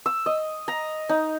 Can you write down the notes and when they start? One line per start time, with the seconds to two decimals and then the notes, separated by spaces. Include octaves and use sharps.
0.06 E6
0.26 D#5
0.68 A#5
1.09 D#4